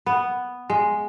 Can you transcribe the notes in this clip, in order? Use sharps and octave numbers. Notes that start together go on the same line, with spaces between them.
B3
G#3